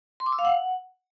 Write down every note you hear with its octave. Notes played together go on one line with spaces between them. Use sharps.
C6
D6
E6
F5
F#5